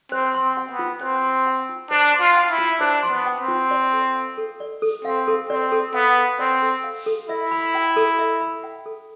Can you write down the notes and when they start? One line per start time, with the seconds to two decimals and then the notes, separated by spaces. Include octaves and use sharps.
0.12 C4 C5
0.35 C6
0.42 C4
0.57 G5
0.71 B3
0.79 F4
1.01 C4 C5
1.24 C6
1.46 G5
1.69 F4
1.91 D4 C5
2.13 C6
2.21 F4
2.36 G5
2.50 E4
2.58 F4
2.80 D4 C5
3.03 C6
3.11 B3
3.26 G5
3.40 C4
3.48 F4
3.71 D5
3.93 A4
4.15 F5
4.38 A4
4.60 D5
4.82 A4
5.05 C4 F5
5.28 A4
5.50 C4 D5
5.72 A4
5.94 B3 F5
6.18 A4
6.39 C4 D5
6.62 A4
6.84 F5
7.06 A4
7.29 E4 E5
7.51 B5
7.74 G5
7.96 A4
8.19 E5
8.41 B5
8.63 G5
8.86 A4